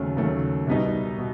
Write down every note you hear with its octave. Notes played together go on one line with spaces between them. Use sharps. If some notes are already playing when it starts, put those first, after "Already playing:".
Already playing: D#2 C#3 F#3 A3 C#4
D#2 C#3 F#3 A3 C#4
C2 B2 G3 B3 D#4
B2